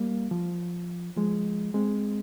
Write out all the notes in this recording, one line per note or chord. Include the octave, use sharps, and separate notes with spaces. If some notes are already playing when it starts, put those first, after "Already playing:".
Already playing: G3 A#3
F3
F3 G#3
G#3 C4